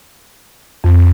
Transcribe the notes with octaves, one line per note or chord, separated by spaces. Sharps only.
F2